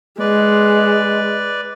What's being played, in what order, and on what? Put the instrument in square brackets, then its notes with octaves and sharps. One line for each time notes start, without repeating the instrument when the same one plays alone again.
[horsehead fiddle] G#3 [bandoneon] B4 D5